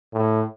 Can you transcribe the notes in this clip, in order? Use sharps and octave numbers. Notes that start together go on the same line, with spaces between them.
A2